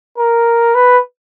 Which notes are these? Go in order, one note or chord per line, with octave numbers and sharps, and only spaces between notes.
A#4
B4